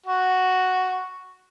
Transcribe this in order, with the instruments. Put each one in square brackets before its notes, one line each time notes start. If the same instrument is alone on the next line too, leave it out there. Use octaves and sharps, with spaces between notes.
[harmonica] F#4